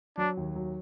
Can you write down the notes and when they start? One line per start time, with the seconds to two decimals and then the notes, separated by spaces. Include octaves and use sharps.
0.18 F#3 D4
0.37 D#2
0.55 F#3